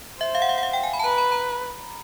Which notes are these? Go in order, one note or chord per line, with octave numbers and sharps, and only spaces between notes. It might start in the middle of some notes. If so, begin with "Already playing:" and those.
C5 E5
F5
F#5
F5
F#5
F5
G5
G#5
B5
A5
B4 A#5
B5
A#5